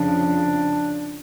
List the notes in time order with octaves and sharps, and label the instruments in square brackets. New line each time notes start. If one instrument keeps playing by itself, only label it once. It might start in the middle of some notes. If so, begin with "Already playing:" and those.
Already playing: [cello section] F2 C#3 F3 [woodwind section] D4